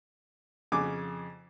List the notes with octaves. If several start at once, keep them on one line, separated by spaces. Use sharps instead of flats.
F2 C#3 G#5 D6